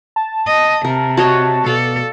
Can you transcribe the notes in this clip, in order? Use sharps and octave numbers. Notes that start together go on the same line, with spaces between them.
A5
D#5
C3 A#4
F#4 C#5 D#5 A5
B2 A4 D5 F5